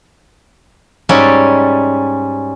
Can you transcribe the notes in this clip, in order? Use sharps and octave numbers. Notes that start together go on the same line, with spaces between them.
G#2 G3 C#4 F#4 D5 E5